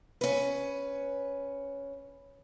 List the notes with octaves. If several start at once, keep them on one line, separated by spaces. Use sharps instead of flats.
C#4 B4